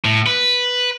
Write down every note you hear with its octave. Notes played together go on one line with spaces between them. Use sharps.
A2
B4